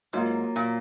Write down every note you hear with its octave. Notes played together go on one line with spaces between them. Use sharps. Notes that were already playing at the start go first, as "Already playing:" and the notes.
G#2 F#3 A#3 F4
A#2